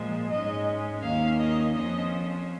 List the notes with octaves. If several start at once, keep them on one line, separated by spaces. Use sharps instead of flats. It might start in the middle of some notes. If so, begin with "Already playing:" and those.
Already playing: A#2 F3 G#3
G#2 G#3 C#4 D#5
D#2 D#3 A#3 C#4 F5
D#5
F2 F3 C#4 D#5